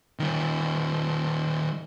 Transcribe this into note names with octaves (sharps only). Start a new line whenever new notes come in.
D#3 G3